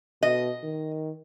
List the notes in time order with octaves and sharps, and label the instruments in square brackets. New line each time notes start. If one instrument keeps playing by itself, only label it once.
[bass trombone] B2 [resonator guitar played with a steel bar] D#5
[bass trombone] D#3